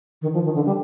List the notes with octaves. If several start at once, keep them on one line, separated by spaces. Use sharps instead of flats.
D#3
F3
D#3
D3
G3